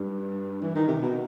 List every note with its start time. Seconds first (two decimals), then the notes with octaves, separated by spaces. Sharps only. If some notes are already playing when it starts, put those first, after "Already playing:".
Already playing: G2
0.62 E3
0.75 D#3
0.88 C3
1.02 B2